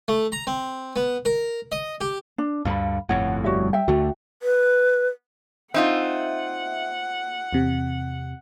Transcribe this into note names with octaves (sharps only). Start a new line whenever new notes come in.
A3
A#5
C4
B3
A#4
D#5
G4
D4
D2 G2 D3 F5 B5
G1 F2 A2 C#5 F#5
G3 F#4 C#5 E5
E5 G5
D2 D3 A3 F#4
B4
C4 D#4 F4 E5 F#5
E2 C3